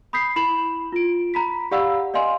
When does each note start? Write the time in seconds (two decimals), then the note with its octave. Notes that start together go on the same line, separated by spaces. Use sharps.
0.13 B5 D#6 G6 B6 C7
0.36 E4 B5 E7 F#7
0.92 F4 D7
1.34 A#5 B5 B6
1.71 G4 D5 F5 F#5 B5 E6
2.14 D5 D#5 F5 G#5 C6